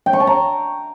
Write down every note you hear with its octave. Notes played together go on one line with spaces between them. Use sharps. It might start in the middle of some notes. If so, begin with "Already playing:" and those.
G5
C#6
A5
A#5